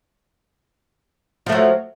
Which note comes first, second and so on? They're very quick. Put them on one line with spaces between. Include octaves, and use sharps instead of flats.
F3 A3 F#3